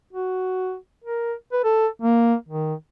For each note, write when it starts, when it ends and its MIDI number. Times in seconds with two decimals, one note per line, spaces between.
0.13 0.75 66
1.05 1.33 70
1.52 1.62 71
1.65 1.87 69
2.02 2.35 58
2.48 2.74 51